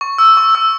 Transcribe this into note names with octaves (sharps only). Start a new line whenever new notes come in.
C#6
E6
C#6
E6